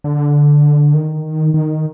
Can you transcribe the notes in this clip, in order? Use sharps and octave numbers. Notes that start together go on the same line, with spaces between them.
D3
D#3
D#3